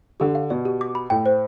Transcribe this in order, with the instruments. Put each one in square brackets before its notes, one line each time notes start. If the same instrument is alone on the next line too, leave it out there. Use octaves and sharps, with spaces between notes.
[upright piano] D3 [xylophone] G4
[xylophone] F5
[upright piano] B2 [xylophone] D5
[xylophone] G4
D6
B5
[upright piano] A2 [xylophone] G5
[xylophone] C5